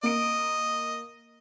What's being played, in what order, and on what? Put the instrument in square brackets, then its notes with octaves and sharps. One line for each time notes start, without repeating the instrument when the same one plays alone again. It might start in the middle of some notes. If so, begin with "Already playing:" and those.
[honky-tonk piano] A#3 D7 [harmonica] D#5